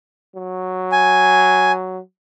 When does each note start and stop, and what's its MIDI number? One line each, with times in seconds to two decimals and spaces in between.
0.36 1.99 54
0.92 1.72 80